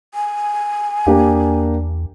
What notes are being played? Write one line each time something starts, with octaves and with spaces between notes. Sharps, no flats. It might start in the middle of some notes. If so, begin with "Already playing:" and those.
G#5
E2 A#3 D4 G4